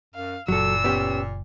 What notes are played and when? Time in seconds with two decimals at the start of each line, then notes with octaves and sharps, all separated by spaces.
0.14 F#2 F5
0.48 F#1 A#2 F#3 A4 E6
0.84 B3 C#4 G4